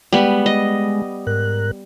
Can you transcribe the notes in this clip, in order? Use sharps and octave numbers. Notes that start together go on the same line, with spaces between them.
G3 G#3 B3
D#5
G#2 A#4 F#6